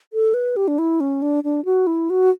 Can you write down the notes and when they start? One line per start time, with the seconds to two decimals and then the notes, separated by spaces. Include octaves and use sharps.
0.13 A4
0.34 B4
0.56 G4
0.68 D4
0.79 E4
1.00 C#4
1.22 D4
1.44 D4
1.65 F#4
1.87 E4
2.10 F#4